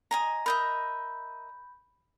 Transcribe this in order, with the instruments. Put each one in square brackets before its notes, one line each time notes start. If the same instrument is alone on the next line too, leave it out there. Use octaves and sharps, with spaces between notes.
[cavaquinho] D#5 G#5 A#5
[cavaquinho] A#4 D#5 E5 [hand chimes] B5 G6